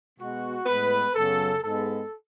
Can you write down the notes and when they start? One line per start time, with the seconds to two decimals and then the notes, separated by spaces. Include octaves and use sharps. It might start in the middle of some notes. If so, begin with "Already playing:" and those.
0.18 B2 G#3 B3 F#4
0.66 A2 G#3 B3 B4
1.15 F#2 C#3 F#3 B3 A4
1.63 G#2 G#3 B3 A4